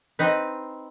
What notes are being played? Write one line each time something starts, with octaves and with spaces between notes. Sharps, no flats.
C4 D#4 B4